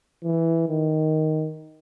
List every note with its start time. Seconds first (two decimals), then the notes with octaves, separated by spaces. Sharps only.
0.24 E3
0.69 D#3